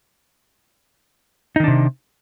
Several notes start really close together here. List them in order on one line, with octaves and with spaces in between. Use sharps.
D#4 D#3 D4 C3